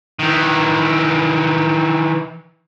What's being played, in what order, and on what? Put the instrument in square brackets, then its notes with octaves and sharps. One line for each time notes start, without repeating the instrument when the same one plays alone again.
[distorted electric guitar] D#3 E3